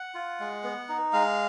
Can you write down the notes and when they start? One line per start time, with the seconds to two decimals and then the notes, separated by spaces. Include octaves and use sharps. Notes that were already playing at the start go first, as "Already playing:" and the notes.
Already playing: F#5
0.14 F4
0.40 G#3
0.64 B3
0.89 D#4
1.13 G#3 F5